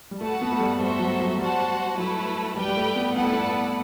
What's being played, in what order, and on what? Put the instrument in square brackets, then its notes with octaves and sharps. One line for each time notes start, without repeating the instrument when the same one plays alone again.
[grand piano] G3
[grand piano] A3 [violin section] F#4 B4 F#5 A5
[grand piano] B3
A3
G3
[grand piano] G3 [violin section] F#4 A4 C5 E5
[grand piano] F#3
F#3
[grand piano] G3 [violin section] F#4 C5 F#5 A5
[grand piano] F#3 [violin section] A3 E4 B4
[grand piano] G3 [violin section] G4 B4 D5 G5
[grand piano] G3
A3
B3
[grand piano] B3 [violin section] E4 B4 D5 F#5 A5
[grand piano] A3
B3